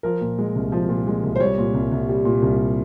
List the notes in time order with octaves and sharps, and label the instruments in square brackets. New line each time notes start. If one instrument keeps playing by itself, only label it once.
[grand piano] F3 A#4
A#2
G#3
C2
F3
A#2
G#3
C2
C5
G3 C#5
A#2
C2
C2
G3
A#2
C2